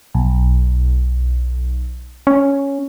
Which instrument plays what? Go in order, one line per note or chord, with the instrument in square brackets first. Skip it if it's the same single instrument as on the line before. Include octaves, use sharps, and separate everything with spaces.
[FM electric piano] B1
[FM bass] C#4